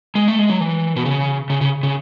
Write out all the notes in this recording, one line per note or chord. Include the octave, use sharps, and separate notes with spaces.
G#3
A3
G#3
F#3
E3
B2
C#3
C#3
C#3
C#3